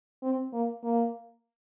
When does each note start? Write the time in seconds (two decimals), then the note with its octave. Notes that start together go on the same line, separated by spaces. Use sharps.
0.23 C4
0.53 A#3
0.83 A#3